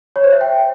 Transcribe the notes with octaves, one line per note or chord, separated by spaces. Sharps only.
C#5
C5
E5
G5